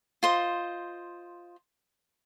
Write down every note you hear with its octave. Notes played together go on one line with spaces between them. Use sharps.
F4 C5 D#5